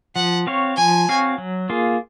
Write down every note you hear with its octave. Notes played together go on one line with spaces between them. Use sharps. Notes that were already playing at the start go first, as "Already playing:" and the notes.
F3 F#5
C4 F#4 C#5 F5
F3 G#5
C4 F#4 C#5 F5
F#3
A#3 F4 G#4